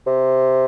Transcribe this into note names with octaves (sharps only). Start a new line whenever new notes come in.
C3